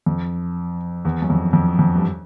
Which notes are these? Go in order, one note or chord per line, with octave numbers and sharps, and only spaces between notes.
F2
E2
F#2
F2
F2
F2
G2